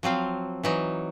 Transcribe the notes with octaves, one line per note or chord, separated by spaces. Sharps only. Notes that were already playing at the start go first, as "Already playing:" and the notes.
F3 F#3 C4 F5
E3 F#3 D#4